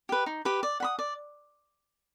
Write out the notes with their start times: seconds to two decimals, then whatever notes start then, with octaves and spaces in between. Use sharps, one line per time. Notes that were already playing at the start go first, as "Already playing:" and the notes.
0.09 G4 B4
0.26 D#4
0.45 G4 B4
0.63 D5
0.80 F#5 B5 D#6
0.99 D5